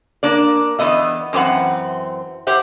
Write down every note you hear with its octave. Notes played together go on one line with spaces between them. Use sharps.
A#3 D4 D5
E2 E3 B3 D#5 E5
F#2 E3 C4 B4 F#5
G4 C5 E5 F#5